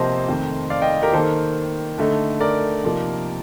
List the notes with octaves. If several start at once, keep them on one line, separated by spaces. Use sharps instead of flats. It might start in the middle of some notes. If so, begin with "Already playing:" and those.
Already playing: C3 F3 A#3 C5 D#5 A5 C6
F2 D#3 A3 C4 D#4
D5 F5
D#5 G5
G4 A#4
D#3 A#3 D#4 A4 C5
D3 A3 D#4
A#4 D5
C3 F3 A#3 D#4